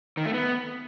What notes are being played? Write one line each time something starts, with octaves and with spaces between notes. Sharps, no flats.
D#3
A3
B3